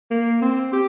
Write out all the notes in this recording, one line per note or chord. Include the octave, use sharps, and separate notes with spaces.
A#3
C4
G4